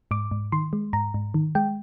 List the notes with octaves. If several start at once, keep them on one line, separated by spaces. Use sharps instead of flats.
G#2 D6
G#2
D#3 C6
G#3
G#2 A#5
G#2
D#3
G#3 G5